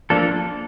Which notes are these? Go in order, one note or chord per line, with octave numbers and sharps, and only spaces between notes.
F3 A#3 D4 A4